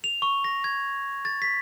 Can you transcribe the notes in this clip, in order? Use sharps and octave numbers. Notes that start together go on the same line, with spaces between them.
F7
C#6
A#6
G#6
A6
B6